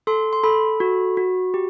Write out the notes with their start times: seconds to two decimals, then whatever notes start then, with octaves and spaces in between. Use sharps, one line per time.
0.07 A4 C6
0.33 C6
0.43 A4 B5
0.80 F#4
1.17 F#4
1.54 G4